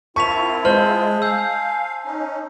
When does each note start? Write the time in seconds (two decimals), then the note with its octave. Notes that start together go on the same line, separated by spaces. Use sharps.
0.16 C4 E4 F4 A#4 A5 C#6 B6 F7
0.65 G#3 C5 A5 F6 F#7
1.22 F5 G#5 E6 G6
2.06 C#4 D#4